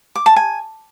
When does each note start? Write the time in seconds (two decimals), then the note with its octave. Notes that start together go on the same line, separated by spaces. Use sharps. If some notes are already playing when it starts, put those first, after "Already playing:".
0.15 D6
0.26 A5
0.36 G#5